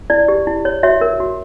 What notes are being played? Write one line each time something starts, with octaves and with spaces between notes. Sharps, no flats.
E4 D5
G4
E4
C#5
F#4 C#5 E5
A#4
F#4